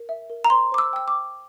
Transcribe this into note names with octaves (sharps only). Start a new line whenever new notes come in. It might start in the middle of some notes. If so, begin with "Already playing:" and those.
Already playing: A#4
E5
A#4
A#5
C5 C6
C5 D6
E6
G5 E6
D6
G5